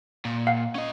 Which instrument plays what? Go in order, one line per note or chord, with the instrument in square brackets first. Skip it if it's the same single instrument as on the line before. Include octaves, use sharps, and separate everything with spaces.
[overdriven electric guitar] A#2
[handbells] F5 F#5
[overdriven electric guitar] C#4 D#5